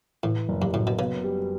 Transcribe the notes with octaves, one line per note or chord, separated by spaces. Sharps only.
A2 E3
F#1
G2
F#2 A2
B2
C#3 B3
G3